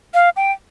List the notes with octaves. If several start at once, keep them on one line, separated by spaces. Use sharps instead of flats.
F5
G5